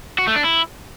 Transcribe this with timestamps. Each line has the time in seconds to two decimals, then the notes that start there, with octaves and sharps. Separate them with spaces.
0.18 F#4
0.27 A3
0.36 D4
0.44 E4